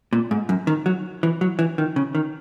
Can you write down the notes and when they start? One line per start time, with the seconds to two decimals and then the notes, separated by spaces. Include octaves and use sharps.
0.13 A#2
0.31 G#2
0.49 F#2
0.67 D#3
0.86 F#3
1.23 E3
1.41 F#3
1.59 E3
1.78 D#3
1.96 C#3
2.15 D#3